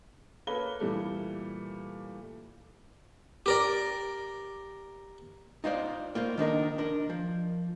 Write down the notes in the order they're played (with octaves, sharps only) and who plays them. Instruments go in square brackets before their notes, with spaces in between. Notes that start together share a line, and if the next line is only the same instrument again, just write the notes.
[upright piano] A#3 A4 B4 C#5 B5 G7
A#2 E3 G3 A3
[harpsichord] G4 A#4 D5
[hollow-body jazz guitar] D#4 F4 C5 D5
A#3 F4 C5
D#3 D4 D#4 A#4
D4 A#4
F3